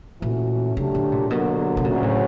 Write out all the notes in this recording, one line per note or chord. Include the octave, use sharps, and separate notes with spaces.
A#2 E3 A3 C#4 F#4
C#3 F#3 A3 D4 G4
D3
A#2
B2 D3 F#3 A#3
B2
D2 A#2 C#3 F#3
A2